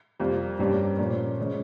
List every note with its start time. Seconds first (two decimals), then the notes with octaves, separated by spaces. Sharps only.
0.19 F2 C3 G3 A#3 F4
0.59 G2 G3 A#3 C#4 G4
0.99 A#2 F3 A#3 C#4
1.39 C#3 F3 G#3 C#4